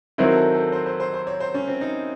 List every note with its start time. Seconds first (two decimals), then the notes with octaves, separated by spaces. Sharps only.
0.18 D#3 F#3 C4 E4 C5
0.36 A4
0.54 A4
0.72 C5
0.86 C5
1.00 C5
1.13 C5
1.27 C#5
1.40 C5
1.54 C#4
1.68 C4
1.81 D#4